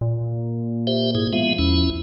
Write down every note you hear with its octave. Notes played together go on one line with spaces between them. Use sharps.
A#2
G4 C5 E5
G#2 E4 G#4
F3 G#3 B3 E5
E2 C#4 E4